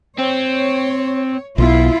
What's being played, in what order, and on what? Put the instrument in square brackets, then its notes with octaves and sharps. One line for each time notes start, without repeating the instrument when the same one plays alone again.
[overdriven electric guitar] C4 [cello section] C#5
[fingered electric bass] B1 B3 [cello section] E4 F4